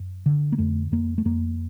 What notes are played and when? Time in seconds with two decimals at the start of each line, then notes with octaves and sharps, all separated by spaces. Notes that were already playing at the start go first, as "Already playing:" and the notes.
Already playing: F#2
0.26 D3
0.52 A#3
0.58 F2 A3
0.92 F2 A#3
1.18 A3
1.25 F2 A#3